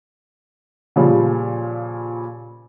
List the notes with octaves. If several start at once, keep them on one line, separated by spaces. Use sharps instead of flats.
A#2 C#3 F3 G3